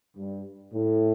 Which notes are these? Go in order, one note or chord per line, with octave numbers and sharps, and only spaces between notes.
G2
A2